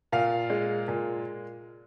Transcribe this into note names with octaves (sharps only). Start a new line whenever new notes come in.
A#2 F5
G#3
A#2